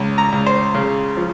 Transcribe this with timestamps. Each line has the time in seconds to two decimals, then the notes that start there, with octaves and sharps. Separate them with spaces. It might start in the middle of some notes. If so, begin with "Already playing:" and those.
Already playing: C#2
0.18 A#5
0.32 C#2
0.46 C5
0.74 C#3
1.17 F3